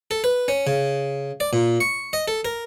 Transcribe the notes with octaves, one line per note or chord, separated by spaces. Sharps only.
A4
B4
C#4
C#3
D5
A#2
C#6
D#5
A4
A#4